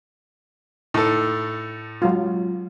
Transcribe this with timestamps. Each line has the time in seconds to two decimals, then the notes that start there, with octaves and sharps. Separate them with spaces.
0.94 A2 D#4 A4
2.02 F#3 G#3 F4